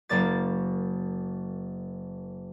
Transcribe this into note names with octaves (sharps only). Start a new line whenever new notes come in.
F#1 A#3 D5 A6